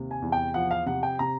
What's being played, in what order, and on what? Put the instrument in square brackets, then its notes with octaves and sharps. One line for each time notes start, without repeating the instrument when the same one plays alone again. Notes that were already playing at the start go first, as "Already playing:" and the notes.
Already playing: [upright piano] D#2 C3
[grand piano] G#5
[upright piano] E2
[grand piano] G5
[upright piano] F3 [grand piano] F#5
[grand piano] F5
[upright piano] C3 [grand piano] F#5
[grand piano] G5
[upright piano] C3 [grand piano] A#5